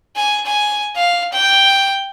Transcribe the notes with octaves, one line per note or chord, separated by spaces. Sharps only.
G#5
G#5
F5
G5